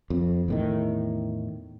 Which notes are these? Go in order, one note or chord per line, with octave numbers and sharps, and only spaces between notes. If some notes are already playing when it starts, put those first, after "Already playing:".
F2
E2 A2 D#3